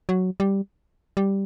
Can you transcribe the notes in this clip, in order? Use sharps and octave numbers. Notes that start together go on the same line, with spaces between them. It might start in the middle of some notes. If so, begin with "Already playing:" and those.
F#3
G3
G3